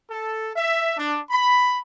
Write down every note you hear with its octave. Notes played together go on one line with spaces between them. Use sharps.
A4
E5
D4
B5